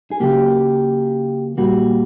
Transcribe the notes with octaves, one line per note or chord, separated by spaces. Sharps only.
G#4
C#3 F#3 A#3 G4
A#2 G3 A#3 F#4